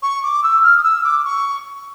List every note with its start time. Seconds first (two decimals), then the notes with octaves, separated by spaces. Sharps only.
0.02 C#6
0.22 D6
0.43 E6
0.63 F6
0.77 D#6
0.82 E6
1.03 D6
1.24 C#6